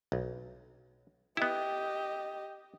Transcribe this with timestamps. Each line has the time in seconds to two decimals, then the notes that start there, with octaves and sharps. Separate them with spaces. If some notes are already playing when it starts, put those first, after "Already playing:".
0.12 B1
1.37 B3 E4 G4 D#5